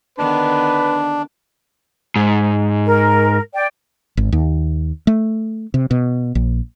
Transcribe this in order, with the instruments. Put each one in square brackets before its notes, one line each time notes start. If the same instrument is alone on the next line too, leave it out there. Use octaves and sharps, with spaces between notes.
[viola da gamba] D3 D#3 B3 [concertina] D4 [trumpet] B4
[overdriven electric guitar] G#2
[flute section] A#4
D5 G5
[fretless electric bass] G#1
D#2
A3
C3
B2
A#1